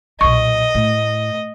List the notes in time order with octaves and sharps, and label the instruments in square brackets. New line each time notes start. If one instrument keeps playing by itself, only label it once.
[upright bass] B1 A#2 [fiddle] D#5 [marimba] C#6
[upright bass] A2